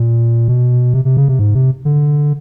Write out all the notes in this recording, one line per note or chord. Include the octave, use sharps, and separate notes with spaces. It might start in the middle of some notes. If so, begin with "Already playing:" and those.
Already playing: A#2
B2
C3
C3
C#3
C3
G#2
C3
D3